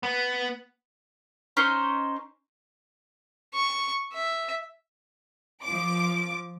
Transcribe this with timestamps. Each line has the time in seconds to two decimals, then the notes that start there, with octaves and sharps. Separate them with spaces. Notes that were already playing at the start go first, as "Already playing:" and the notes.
0.03 B3
1.57 C#4 D#4 C5
3.54 C#6
4.13 E5
5.62 F3 D6